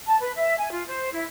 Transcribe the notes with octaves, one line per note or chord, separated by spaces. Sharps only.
A5
B4
E5
G#5
F4
C5
E4